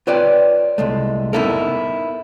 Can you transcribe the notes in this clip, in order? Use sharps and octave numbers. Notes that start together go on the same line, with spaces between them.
F4 B4 C#5 D5 G5
C2 G#3 A3
B3 D#4 E4 A4 A#4